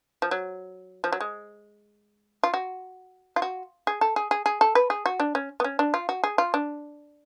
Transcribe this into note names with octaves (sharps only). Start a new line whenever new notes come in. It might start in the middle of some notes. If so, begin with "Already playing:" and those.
F3
F#3
F3
F#3
G#3
F4
F#4
F4
F#4
G#4
A4
G#4
G#4
G#4
A4
B4
G#4
F#4
D4
C#4
B3
C#4
D4
F4
F#4
G#4
F4
D4